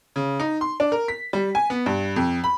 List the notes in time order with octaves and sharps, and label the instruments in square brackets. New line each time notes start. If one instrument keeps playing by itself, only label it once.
[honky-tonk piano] C#3
D#4
C6
D4
A#4
B6
G3
G#5
B3
G2
F2
B5